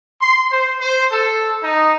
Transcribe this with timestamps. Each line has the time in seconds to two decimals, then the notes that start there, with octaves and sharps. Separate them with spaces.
0.21 C6
0.50 C5
0.80 C5
1.11 A4
1.62 D#4